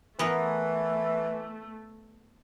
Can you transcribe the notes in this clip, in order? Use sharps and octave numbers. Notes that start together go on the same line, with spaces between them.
E3 A3 B3 A#4